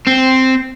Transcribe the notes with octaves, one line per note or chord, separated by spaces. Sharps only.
C4